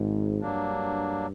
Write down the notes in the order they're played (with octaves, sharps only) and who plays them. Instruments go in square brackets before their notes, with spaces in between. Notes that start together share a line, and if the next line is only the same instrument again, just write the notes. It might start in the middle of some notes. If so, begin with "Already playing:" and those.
Already playing: [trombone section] G#1 G#2
[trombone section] G2 [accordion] F#3 A#3 D4